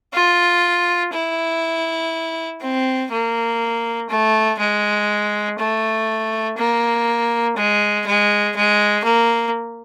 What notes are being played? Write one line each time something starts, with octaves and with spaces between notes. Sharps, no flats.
F4
E4
C4
A#3
A3
G#3
A3
A#3
G#3
G#3
G#3
A#3